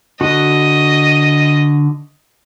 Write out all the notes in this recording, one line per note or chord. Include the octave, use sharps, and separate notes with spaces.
D3 F#4 D#5